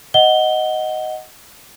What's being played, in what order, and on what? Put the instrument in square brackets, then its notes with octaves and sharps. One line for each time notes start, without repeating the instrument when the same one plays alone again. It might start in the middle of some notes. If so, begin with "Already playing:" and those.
[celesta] D#5 F#5 G7